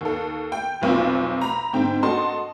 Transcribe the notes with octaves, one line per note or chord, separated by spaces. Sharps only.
D#2 A4
G5
F1 B1 C4 F4
A#5 B5
G#2 D3 C4 G5
F#4 A4 D#5 A5 C6